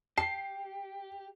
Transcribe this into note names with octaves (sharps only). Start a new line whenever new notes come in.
G4 A5 C7